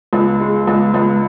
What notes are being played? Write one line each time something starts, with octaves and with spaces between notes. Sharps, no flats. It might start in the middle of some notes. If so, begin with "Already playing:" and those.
C#2
G#3
C#2
C#2